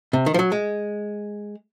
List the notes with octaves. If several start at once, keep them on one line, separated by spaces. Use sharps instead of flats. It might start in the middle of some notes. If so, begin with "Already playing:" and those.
C3
D#3
F3
F#3
G#3